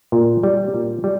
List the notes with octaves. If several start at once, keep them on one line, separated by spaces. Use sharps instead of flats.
A#2
G3
A#2
G3